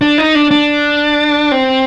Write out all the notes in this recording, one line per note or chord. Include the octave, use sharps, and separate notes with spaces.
D4
D#4
D4
D4
C4